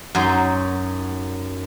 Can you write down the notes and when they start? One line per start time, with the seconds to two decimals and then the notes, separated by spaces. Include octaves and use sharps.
0.15 F#2 F#3 D#4 C6